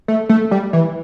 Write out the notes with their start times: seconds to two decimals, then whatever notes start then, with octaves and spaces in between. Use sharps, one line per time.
0.08 A3
0.29 A3
0.51 G3
0.73 E3